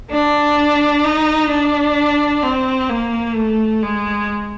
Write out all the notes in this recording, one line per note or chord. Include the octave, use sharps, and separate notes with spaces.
D4
D#4
D4
C4
A#3
A3
G#3